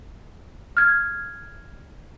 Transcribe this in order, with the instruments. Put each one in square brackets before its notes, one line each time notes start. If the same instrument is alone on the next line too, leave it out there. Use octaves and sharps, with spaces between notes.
[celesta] F6 G#6